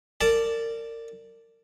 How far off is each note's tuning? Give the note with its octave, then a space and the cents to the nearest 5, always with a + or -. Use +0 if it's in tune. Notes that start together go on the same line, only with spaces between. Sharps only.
A#4 -30 D5 +0 A5 +0